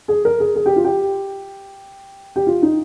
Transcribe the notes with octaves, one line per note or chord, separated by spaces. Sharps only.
G#4
A#4
G#4
G#4
G4
F4
G4
G4
F4
D#4